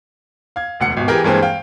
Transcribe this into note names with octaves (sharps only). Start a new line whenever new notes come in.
F5 G#6
E1 D2 F#5 C#7
G#1 B2
E3 G4 G#4 A#4
G2 E3 G#3 A#3 C4
F5 G5